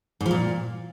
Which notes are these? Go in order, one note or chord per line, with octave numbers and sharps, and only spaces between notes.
G#2
F3
A#2